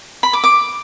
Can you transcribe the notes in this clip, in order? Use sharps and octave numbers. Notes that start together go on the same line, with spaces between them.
B5
D6
D6